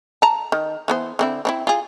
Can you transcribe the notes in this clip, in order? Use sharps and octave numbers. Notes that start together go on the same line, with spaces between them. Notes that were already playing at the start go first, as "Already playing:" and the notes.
A5 A#5
D#3
E3 B3 C5
D3 C4 E4
C4 D#4 E4
F4 G#4